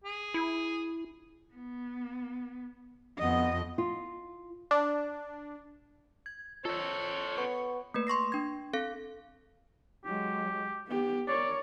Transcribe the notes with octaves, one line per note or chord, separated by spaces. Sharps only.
G#4
E4
B3
F2 B3 D#5
F4
D4
G#6
F4 A4 C5 C#5
B3 C#6
A3 A#3 B4
C6 C#6 A#6 C7
D4 G#6
C4 A4 F5
F#3 G#3 G4
B3 G4
A#4 C#5 D5